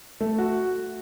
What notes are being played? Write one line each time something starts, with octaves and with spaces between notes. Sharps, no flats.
A3
F#4